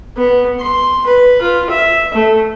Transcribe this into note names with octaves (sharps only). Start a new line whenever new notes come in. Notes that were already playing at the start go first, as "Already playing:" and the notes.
B3
C6
B4
F4
E5
A3